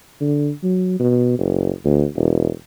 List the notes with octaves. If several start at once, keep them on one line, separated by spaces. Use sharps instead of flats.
D3
F#3
B2
F#1
D2
E1